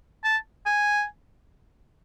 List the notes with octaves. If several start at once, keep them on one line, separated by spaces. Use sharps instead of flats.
A5
G#5